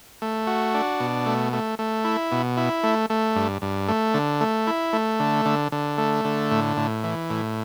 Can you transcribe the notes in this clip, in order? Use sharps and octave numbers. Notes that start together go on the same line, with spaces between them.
A3
F#4
D4
B2
A3
A3
A3
E4
B2
E4
A3
A3
G2
G2
A3
D3
A3
E4
A3
D3
D3
D3
A3
D3
A2
A2
E3
A2